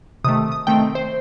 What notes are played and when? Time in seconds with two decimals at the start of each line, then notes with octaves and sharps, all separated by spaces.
0.24 C3 D#3 A3 D#6
0.52 D#6
0.67 D#3 A3 C4 G5
0.95 C5